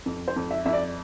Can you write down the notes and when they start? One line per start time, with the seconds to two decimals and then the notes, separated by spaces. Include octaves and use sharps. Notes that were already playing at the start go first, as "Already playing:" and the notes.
0.06 F2
0.28 C5
0.36 F2
0.51 E5
0.65 F2 E5
0.73 D5